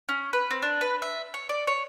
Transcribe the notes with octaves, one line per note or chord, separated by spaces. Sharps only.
C#4
B4
C4
D4
B4
E5
C#5
D5
C#5